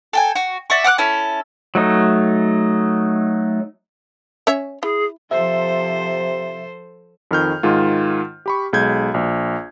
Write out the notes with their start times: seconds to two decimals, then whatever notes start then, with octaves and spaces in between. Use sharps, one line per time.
0.13 A4 G5 G#5
0.35 F#4
0.70 D5 E5 F#5 C#6
0.84 F#5 D6 F6 F#6
0.98 C#4 E4 A4
1.75 F#3 A3 D#4
4.47 C#4 C#5 E5
4.83 E4 G#4
5.31 C3 F3 A4 C5 E5
7.31 F2 D#3 F6 G6
7.63 G#2 D#3 F4
8.46 G4 B5 C#6
8.73 B1 G#3 G6 G#6
9.14 A#1